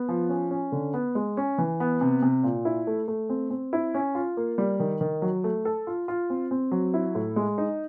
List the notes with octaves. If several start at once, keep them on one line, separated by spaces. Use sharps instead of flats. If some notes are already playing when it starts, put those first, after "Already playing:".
Already playing: B3
F3
C#4
C#4
D3
B3
G#3
C#4
E3
B3
C3
C3
A#2
E4
A3
A3
C4
C4
E4
C#4
F4
A#3
G3
D#3
D#3
F#3
A3
A4
F4
F4
C4
C4
F#3
E4
A2
G#3
D#4